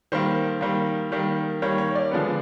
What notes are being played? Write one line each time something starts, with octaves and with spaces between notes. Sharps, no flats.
D#3 G3 A#3 C5
D#3 G3 A#3
D#3 G3 A#3
D#3 G3 A#3 C#5
C#5
D5
D3 F3 G#3 B3